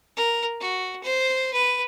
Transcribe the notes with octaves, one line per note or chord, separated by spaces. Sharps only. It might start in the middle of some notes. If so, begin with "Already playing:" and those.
A#4
F#4
C5
B4